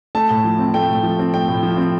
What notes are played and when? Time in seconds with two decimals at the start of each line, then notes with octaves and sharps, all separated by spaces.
0.15 A3 A5
0.30 A2
0.44 F3
0.59 C4
0.74 A3 G5
0.89 A2
1.04 F3
1.19 C4
1.34 A3 G5
1.48 A2
1.63 F3
1.77 C4